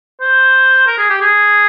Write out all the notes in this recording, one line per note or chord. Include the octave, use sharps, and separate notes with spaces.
C5
A#4
G#4
G4
G#4